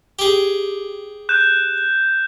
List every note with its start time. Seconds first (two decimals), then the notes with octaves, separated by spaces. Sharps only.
0.19 G4 G#4
1.29 F#6 G6 E7